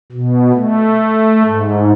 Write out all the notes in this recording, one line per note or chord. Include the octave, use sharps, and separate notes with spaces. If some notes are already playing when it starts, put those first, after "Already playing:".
B2
A3
G#2